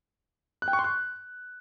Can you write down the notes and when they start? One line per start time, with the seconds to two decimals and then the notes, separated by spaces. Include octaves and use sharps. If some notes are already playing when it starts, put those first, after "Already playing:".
0.62 F#6
0.68 G5
0.73 C#6
0.79 C6
0.84 F#6